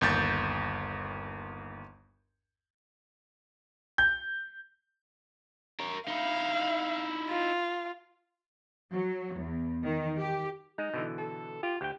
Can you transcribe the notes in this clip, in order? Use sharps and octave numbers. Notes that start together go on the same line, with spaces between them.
G1 D#2 G6 A6
G6
A#4 C#5
D#4 E4 F5
F4
F#3
E2
D#3
G4
G#3 D#4
B2 D3 E3
A4
F4 G4
D2 G4 G5